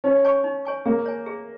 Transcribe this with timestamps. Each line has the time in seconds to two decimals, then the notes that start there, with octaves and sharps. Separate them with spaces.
0.04 C#4 D#4
0.25 C#5 G#5 C#6
0.44 D#4
0.65 C#5 G#5 C#6
0.86 A#3 G#4
1.06 C#5 G#5
1.26 G#4